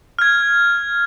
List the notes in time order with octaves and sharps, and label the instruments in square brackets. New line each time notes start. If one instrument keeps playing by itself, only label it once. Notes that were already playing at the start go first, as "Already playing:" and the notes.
[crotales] F6 G#6